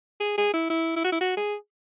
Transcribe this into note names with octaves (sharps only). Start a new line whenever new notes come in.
G#4
G#4
E4
E4
E4
F#4
E4
F#4
G#4